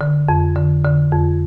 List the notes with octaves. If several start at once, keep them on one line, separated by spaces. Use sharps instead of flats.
D3
F2
D3
D3
F2